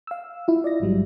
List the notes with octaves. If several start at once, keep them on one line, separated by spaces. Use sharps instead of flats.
F5 E6
E4 F4
D5 D#5 A#6
A1 G#2 F#3 G3